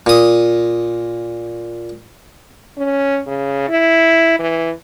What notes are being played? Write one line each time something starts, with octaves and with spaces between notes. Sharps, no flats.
A#2 D#6
C#4
C#3
E4
E3